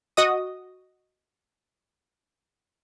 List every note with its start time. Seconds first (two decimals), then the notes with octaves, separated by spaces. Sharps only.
0.17 F#4 D#5 D#6